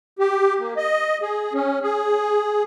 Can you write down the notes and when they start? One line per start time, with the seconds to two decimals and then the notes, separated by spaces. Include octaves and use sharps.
0.19 G4
0.60 A#3
0.77 D#5
1.22 G#4
1.54 C#4
1.83 G#4